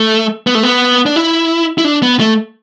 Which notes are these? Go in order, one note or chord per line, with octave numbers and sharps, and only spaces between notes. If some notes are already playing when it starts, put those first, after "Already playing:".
Already playing: A3
B3
A3
B3
D4
E4
E4
D4
B3
A3